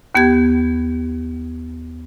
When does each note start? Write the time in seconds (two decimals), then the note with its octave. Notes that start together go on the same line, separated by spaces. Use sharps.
0.15 D#2 B3 G4 G#6